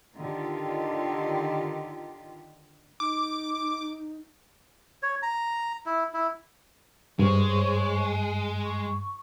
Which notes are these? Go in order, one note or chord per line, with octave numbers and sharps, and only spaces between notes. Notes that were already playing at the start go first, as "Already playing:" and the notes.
D3 D#3 F4 G4
D#4 D6
C#5
A#5
E4
E4
G2 G#3 C5 C#5 C#6
C#6